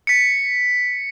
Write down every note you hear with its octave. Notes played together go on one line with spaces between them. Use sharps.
B6 C#7